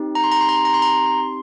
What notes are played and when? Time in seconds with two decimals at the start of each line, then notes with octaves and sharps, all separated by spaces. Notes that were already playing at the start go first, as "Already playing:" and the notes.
Already playing: C4 D#4 G4
0.15 A#5
0.24 C6
0.32 A#5
0.41 C6
0.49 A#5
0.56 C6
0.65 A#5
0.74 C6
0.82 A#5
1.06 C6